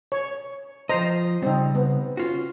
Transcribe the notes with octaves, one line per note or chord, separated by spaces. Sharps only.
C#5
F3 F4 C5 D#5 A#5
C#3 G3 C4 D#4
B3
C#4 F4 F#4